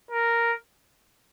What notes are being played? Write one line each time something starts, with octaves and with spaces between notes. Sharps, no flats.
A#4